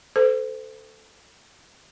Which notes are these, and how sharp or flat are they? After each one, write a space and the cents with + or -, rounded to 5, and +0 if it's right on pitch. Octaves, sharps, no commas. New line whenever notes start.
A4 +0 C5 -30